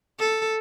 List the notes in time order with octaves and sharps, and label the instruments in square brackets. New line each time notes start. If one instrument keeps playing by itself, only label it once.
[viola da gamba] A4